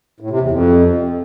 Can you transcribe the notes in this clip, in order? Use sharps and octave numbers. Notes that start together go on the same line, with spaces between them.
A2
C3
E2
F2